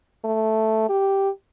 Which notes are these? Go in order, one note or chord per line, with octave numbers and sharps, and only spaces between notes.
A3
G4